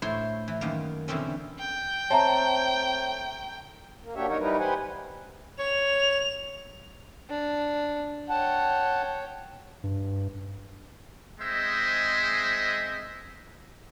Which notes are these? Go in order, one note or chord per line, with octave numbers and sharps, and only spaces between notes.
A2 E4 C5 C#5 C6
E3
F#2 D#3 A#3
B2 D3 E3 C4 C#4
G5
A3 C4 C#5 E5 A5 A#5
A#3
F#3 A#3 D4 G4 C#5 E5
F#3 D#4 F#4 A#4 C#5
E3 G3 D#4 A#4 B4
G4 B4 C5 F#5 G#5
C#5 F7
D4
C#5 F#5 G5 A5
G2
G#3 C4 G#4 C5 D#5 E5